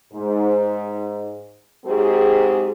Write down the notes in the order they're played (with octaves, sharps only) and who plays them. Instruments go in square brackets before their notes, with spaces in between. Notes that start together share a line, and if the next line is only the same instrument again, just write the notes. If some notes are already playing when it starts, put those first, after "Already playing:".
[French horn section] G#2
G#2 F#3 C4 G4 G#4